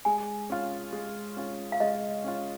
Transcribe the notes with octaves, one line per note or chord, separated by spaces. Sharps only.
G#3 G#5
C#4 F4
G#3
C#4 F4
F5
G#3 D#5
C#4 F4